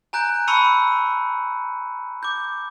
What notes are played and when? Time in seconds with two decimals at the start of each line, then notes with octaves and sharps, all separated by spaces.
0.13 G#5 A#5 F#6 G6 D7
0.48 A5 B5 C#6 E6 C#7 D#7
2.23 D6 G6